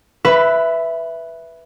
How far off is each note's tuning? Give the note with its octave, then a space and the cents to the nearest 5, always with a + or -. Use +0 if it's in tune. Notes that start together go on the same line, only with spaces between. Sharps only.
B4 +0 E5 +0 B5 +25